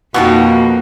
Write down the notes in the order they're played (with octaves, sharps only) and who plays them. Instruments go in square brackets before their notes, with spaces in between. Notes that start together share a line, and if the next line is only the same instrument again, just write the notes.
[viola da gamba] F2 A#3 [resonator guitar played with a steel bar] B2 D#4 [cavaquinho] F#4 G4 A5